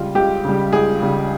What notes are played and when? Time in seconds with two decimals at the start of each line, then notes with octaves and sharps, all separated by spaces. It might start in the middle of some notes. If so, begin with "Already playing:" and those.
Already playing: C#2 C#3 G3 F4
0.15 C#2 G4
0.44 C#3 G3
0.73 C#2 G#4
1.02 C#3 G3